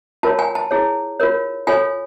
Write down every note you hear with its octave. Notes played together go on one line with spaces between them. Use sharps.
F4 A#4 C#5 A5
G#5
A5
E4 G#4 C#5
F4 A#4 C#5
F4 A4 C#5 G#5